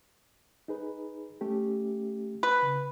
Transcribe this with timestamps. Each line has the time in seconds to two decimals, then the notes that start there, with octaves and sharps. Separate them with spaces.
0.68 D#4 G#4 B4
1.41 A3 C#4 G4
2.43 B4
2.63 C#3